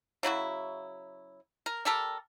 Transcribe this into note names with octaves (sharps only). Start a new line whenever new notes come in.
C#3 F#3 E4 F#4
A#4
G3 G4 A4 A#4